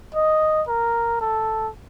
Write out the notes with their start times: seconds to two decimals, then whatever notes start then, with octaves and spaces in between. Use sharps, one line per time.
0.15 D#5
0.68 A#4
1.21 A4